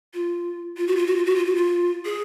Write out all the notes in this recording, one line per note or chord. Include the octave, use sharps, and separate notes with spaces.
F4
F4
F#4
F4
F#4
F4
F#4
F4
F#4
F4
G#4